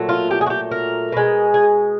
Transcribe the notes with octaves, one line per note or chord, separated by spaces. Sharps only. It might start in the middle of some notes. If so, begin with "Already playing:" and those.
Already playing: A#2 F#3 A3
F4
G4
G#4
F#4
G4
A#4
B2 G#3
G#4